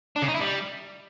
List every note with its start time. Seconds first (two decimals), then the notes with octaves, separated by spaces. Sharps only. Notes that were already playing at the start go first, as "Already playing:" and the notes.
0.16 D4
0.22 C#3
0.28 D#4
0.34 E4
0.40 G3